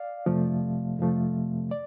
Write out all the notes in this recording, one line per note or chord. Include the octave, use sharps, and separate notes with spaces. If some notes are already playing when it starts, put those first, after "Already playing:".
Already playing: D5 F5
F2 C3 F3 A3
F2 C3 F3 A3
D5